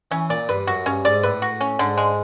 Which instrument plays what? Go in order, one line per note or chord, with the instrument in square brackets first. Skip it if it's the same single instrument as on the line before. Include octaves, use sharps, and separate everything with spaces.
[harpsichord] E3 [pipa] C#4
[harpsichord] A#2 [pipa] D5
[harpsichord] G2 [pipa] B4
[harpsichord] F#2 [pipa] F#4
[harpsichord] G2 [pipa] C#4
[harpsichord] G#2 [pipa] D5
[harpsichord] A2 [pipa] B4
[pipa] F#4
C#4
[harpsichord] G#2 [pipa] D3
[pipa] G#3